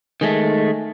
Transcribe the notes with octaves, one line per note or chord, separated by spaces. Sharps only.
D#3 G#3 A3